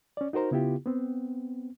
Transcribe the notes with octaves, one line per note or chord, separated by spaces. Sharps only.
C#4 D5
D#4 F#4 A#4 C5 A#5
C#3 B3 E4 F4 G4
B3 C4